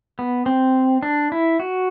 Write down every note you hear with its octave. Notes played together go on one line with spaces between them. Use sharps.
B3
C4
D4
E4
F#4